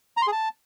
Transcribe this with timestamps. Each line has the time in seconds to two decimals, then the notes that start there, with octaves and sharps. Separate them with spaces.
0.17 A#5
0.22 C6
0.27 G#4
0.32 A5